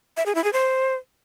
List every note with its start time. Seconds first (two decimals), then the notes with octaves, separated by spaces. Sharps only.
0.17 E5
0.26 G#4
0.35 E4
0.44 G#4
0.53 C5